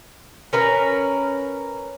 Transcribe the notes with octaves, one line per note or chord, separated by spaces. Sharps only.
C#4 A#4 B4